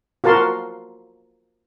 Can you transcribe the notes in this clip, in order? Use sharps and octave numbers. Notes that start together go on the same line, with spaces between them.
F4 F#4 A#4 A5 C6